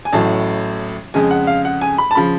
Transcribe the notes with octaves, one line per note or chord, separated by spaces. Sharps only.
G#5
A1 A2 F#3 A5
F2 C#3 G#3 G#5
F#5
F5
F#5
G#5
B5
A5
C#3 F3 B5